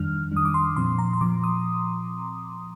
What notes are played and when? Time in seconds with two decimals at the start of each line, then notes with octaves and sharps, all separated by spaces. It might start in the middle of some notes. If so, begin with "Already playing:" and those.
Already playing: F2 D#3 G3 D4 F6
0.32 F2 D#3 G3 D4 D#6
0.45 D6
0.54 C6
0.76 A#2 F3 C4 C6
0.99 A#5
1.13 C6
1.21 A#2 F3 C4 D6
1.44 D#6